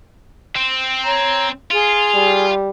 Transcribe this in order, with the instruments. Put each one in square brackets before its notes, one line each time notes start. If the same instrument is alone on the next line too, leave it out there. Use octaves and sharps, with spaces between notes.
[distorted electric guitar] C4
[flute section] C#5 A#5
[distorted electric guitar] F4 [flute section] G#4
[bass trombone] G3